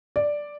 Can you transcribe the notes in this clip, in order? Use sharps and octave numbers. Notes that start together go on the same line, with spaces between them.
D5